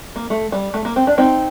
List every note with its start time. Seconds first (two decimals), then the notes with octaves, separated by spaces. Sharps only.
0.16 A#3
0.30 A3
0.52 G3
0.74 A3
0.85 A#3
0.96 C4
1.07 D4
1.18 C4 D#4